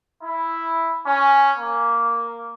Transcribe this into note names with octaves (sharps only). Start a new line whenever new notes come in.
E4
C#4
A#3